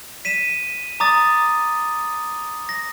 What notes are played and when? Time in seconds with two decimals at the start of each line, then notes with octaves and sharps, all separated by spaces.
0.25 B6 D#7 E7
1.00 A#5 D6 D#6 A6
2.69 A#6